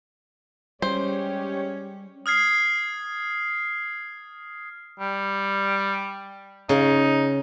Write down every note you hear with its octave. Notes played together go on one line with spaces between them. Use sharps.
G3 G#3 C#4 G4 C5 C#5
D#6 F6 G#6 C7
G3
C#3 D#4